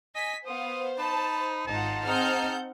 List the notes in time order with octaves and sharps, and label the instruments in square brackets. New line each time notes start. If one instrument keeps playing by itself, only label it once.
[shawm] D#5 [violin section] G#5 B6
[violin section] B3 F5 [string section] C5 [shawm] D#6
[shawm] D#4 [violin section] A5 [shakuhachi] B5
[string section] G#1 [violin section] D#4 F4 F#5 [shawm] A5
[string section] C4 D#4 F6 [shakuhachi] G#4 [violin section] F#5 G6